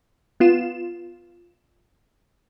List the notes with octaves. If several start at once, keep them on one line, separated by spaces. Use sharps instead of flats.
B3 F4 E7